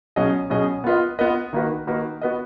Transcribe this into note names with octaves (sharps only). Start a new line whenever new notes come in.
B2 F#3 C#4 G#4 D#5
B2 F#3 C#4 G#4 D#5
B3 F4 B4 D#5
B3 F4 B4 D#5
D#3 A#3 D#4 F#4 B4
D#3 A#3 D#4 F#4 B4
B3 F#4 B4 D#5